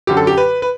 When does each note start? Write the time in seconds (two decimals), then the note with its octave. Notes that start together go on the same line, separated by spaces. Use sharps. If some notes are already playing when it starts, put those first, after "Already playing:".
0.07 F#2 D3 F#3 G4
0.17 A4
0.27 G4
0.37 B4
0.62 B4